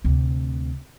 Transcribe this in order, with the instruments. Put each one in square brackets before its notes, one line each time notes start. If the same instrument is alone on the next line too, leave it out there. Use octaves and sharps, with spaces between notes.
[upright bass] D2 C3